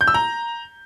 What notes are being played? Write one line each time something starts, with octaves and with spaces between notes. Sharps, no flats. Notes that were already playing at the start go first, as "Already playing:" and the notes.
G6
E6
A#5